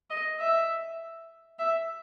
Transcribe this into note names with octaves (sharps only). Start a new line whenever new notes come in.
D#5
E5
E5